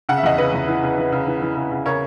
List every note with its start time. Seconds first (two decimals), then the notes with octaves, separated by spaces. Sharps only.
0.09 C#3 F#5
0.17 E5
0.23 E2 D#5 F#5
0.38 C#3 B4 D#5
0.53 E2
0.68 E3
0.83 C#3
0.98 E3
1.12 C#3
1.27 E3
1.42 E3
1.56 C#3
1.71 C#3
1.86 C#3 A#4 C#5